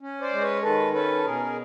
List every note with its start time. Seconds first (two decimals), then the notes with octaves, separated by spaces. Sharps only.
0.01 C#4
0.21 C5 D5
0.32 G#3
0.41 B4 C#5
0.62 D#3 A4 B4
0.93 C#4 A4 B4
1.24 B2 G#4 A#4